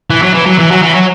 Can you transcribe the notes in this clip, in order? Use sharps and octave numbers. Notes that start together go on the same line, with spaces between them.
E3
F#3
E3
F#3
E3
F#3
E3
F#3